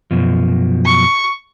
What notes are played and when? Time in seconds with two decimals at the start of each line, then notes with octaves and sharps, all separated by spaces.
0.11 F#2 B2 F3
0.86 C#6